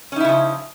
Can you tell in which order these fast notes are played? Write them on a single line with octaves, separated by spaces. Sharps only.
C#4 D#4 E4 C#3 F3